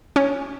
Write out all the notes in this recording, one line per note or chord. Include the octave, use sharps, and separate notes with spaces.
C#4